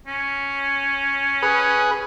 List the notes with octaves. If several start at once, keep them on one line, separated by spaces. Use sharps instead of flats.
C#4
G#4 B4